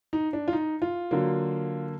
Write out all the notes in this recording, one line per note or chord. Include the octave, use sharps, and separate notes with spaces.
D#4
D4
F4
D#4
F4
D3 F#3 A#3